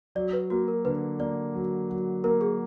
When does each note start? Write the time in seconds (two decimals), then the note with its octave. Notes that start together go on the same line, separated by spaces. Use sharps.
0.15 F#3 D5
0.33 B4
0.50 A#3 F#4
0.68 A#4
0.85 D3 B4
1.20 A#3 D5
1.54 F#3
1.90 F#3
2.24 A#3 A#4
2.41 G#4